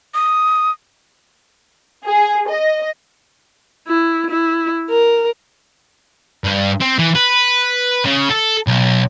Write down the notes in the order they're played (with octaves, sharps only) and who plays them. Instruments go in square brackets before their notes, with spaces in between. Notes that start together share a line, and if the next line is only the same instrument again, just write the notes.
[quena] D#6
[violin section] G#4
D#5
[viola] E4
E4
A#4
[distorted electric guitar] G2
C4
E3
B4
C#3
A4
B1